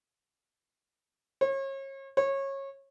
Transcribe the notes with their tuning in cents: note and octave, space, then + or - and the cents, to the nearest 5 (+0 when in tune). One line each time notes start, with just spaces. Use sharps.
C#5 -35
C#5 -20